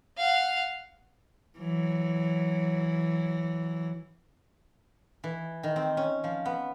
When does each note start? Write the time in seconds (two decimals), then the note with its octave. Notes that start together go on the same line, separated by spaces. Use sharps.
0.17 F5 F#5
1.58 E3 F#3
5.24 E3
5.63 D#3
5.76 C4
5.97 C#4
6.24 F3
6.45 B3